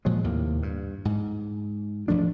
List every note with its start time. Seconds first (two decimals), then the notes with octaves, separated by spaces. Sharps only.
0.05 A#2 F3 F#3 G#3
0.24 D#2 A2 C3 A#3
0.63 G2
1.05 G#2
2.08 E1 F3 A3 D4